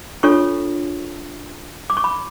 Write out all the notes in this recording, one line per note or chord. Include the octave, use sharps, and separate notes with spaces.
D4 F4 A4 C#5 C#6
D6
C#6
B5